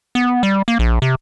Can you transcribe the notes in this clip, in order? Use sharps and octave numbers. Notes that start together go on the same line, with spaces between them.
B3
G3
A#3
A#1
C3